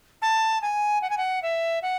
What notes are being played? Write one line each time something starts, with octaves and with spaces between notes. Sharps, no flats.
A5
G#5
F#5
G#5
F#5
E5
F#5